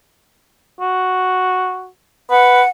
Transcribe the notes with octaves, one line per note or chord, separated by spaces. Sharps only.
F#4
B4 F#5